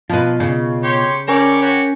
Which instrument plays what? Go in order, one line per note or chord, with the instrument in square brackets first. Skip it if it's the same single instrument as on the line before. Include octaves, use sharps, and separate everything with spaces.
[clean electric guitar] B2 F4 [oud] F3 B4
[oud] C#3
[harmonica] G4 C#5 C6
[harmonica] G3 C#5 D5 [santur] C#4 [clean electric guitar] A#4
[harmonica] F#4 G4 C#5